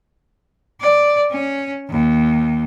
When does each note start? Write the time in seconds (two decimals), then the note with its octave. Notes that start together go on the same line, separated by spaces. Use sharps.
0.81 D5
1.31 C#4
1.90 D#2